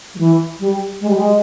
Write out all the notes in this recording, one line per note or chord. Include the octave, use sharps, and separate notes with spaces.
G3
E3
G3
G#3
G3
G#3